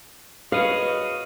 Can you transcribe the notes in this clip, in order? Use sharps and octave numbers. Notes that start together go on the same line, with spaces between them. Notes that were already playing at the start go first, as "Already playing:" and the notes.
F#4 G#4 B4 C#5 D#5 F5